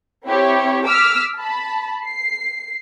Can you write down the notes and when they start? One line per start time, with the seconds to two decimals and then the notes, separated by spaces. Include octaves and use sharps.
0.25 C4 E4 G4 C#5
0.85 D6 E6 F6 B6
1.37 A5 B5
2.06 C7